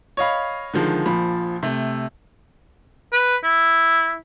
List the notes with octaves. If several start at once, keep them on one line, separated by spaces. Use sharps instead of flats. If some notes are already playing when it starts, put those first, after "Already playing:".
C#5 D#5 F5 B5
D3 D#3 F3 G#3
A#1 F3 B5
C3 A3
B4
E4